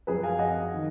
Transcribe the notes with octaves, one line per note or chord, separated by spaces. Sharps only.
F#2 F3 G#4 B4
F5 G#5
D#5 F#5
D#3